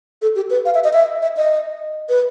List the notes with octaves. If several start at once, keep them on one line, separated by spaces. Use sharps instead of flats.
A4
G4
B4
F5
E5
D#5
E5
E5
D#5
B4